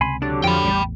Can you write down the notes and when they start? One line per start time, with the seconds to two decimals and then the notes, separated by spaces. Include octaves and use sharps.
0.01 C#2 C3 G#5 B5 C6
0.22 D3 F#3 D4 G4
0.44 F2 F3 G5 B5
0.65 A1 E2 A2 G3